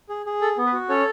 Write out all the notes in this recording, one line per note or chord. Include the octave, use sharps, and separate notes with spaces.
G#4
G#4
A4
B3
B4
F#4
C#4 A4 C#5